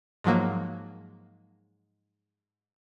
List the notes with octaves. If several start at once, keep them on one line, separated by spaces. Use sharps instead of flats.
G#2 F3 F#3 A#3